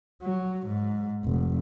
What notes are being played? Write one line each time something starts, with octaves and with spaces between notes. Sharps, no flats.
F#3
G#2
F1